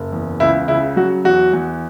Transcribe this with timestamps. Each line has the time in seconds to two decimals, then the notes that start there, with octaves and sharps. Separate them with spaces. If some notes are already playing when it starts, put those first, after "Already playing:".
Already playing: F#1
0.12 E2
0.40 C#2 E4
0.68 C#3 E4
0.96 F#3 F#4
1.24 E2 F#4
1.53 E2